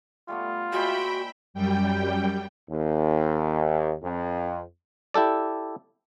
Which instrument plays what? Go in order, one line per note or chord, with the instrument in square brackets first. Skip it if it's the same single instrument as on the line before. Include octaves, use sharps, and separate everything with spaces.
[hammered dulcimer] G3 A3 B3 [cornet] F4
[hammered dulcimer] A#2 G#3 C5 [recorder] F#4 [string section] E5 G5 B5
[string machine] F#2 G3 G5
[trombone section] D#2
F2
[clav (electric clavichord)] E4 G4 A4 D5